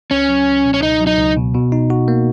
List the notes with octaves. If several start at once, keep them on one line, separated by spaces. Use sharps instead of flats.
C#2 C#4
F#3
C#2
B2
C#4
C#2 D#4
F#3
D#4
C#2
B2
B2
D#4
F#4
A#3